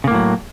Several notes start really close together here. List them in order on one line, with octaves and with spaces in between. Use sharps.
C#3 A#3 A2 F#3